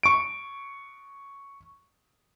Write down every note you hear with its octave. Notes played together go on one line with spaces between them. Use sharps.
C#6 D7